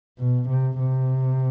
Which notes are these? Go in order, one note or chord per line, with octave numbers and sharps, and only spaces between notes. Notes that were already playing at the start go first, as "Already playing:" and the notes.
B2
C3
C3